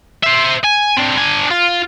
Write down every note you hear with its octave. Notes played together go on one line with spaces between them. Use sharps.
C5 E5
G#5
C4 D4
D4 G#5
F4